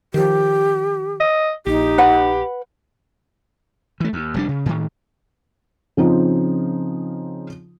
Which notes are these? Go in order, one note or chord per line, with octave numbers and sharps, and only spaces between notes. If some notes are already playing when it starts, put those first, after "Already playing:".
D#3 F3 G4
D#5
A#1 D#4 G4
B4 F#5 B5
E3 A3
D#2
F1 G3 D4
C#3
A2 D#3
C#3 F3 C4 D#4 F4